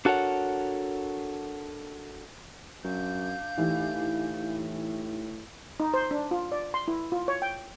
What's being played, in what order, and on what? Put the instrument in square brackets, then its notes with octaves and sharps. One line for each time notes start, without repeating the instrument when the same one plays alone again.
[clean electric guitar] D4 F#4 A4 A#4 C#5 F#5
[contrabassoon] F#2 [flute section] D4 F5 G6
[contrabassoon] A2 [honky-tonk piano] E3 [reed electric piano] D#4 G4
[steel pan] D#4
C5
D4
F4
D5
C6
E4
F4
C#5
G5